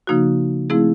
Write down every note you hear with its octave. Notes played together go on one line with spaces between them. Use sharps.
C#3 F3 A#3 D#4 F#4
F3 A3 C4 E4 G#4